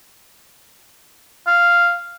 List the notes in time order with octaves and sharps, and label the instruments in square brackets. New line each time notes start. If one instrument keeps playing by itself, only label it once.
[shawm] F5